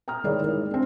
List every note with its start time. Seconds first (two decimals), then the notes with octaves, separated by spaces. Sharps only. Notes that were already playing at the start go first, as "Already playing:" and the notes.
0.08 G5 A#5 D#6 F6
0.24 D#3 G#3 E4 A#4 C#5 D5
0.48 G#3
0.71 C4 D4